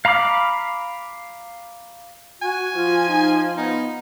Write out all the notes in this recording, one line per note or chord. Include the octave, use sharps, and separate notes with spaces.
F5 A#5 B5 D6 F6
F#4 G#5
F3 F4
D#4
B3 D#4